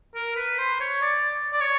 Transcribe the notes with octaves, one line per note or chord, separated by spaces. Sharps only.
A#4
B4
C5
C#5
D5
D5
C#5